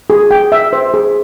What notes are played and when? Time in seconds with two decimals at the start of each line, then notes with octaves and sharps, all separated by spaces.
0.10 G#4
0.31 G5
0.52 E5
0.73 C5
0.94 G#4